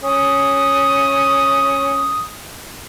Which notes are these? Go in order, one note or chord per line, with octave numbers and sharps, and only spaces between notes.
C#4 D#6